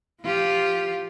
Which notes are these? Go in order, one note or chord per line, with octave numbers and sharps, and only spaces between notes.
F3 F4 G4